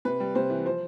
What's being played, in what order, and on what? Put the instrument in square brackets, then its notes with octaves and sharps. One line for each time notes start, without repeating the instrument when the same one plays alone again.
[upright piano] C3 B4
G3
C3 C5
E3
F3 C5